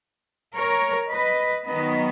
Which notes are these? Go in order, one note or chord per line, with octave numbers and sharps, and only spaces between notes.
A#4 C#5
B4 D#5
D#3 F#3 B3 B4 D#5